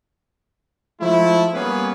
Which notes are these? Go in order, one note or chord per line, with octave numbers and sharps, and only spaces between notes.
F3 G#3 A3 E4
G3 A#3 B3 C#4 G#4 B4